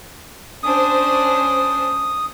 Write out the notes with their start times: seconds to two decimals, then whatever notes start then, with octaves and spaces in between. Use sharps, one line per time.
0.63 C#4 D4 C5 D#6